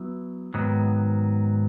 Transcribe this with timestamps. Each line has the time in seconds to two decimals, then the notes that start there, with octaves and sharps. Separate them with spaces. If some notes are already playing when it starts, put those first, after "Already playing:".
Already playing: F#3 B3 E4
0.54 G#2 D#3 F#3 B3